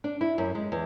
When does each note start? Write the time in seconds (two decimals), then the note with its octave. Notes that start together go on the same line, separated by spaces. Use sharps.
0.04 D4
0.21 E4
0.38 F#2
0.55 G#3
0.72 E2